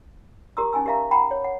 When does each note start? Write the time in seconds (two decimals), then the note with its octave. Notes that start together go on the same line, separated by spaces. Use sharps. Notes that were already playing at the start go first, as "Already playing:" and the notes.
0.57 G4 A#4 A#5 C6 D#6 E6
0.73 C#4 D#4 G#5 A5 E6
0.86 G4 A#4 E5 F5 A#5
1.11 F#5 G5 A#5 B5
1.31 C#5
1.44 F#5